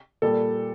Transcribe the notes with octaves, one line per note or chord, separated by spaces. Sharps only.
A#2 G3 A4